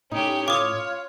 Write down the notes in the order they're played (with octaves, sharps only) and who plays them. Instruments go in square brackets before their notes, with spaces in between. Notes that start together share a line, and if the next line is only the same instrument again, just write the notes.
[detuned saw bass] A2 [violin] C#4 G4 [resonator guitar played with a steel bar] D#4
[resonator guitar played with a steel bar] F4 [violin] C#5 [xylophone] D6 D#6